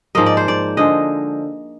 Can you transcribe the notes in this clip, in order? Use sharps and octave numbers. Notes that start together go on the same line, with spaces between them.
G#2 F3 A#3 D#5
D5
C5
D5
D3 F3 G#3 D#5